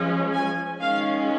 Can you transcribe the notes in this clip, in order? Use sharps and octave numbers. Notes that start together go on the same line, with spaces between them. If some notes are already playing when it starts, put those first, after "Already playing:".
Already playing: F3 G#3 C#4
G#5
D#3 G#3 C#4 F5